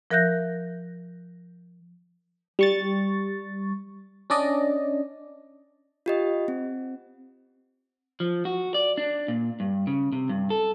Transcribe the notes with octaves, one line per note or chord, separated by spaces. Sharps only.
F3 A#4 E5 F#6 G6 A#6
G3 C#6 A6
C#4 D4 D5 D#5
F4 G4 D#5
C4
F3
F#4
D5
D4
A#2
G2
C#3
C3
G2
A4